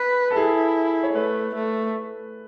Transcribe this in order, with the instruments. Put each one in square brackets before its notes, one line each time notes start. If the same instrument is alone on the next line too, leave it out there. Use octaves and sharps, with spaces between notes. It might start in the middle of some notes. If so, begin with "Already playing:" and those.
Already playing: [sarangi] B4
[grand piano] A4
[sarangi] E4 [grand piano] G#4
[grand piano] C#5
[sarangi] A3 [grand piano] B4
[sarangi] A3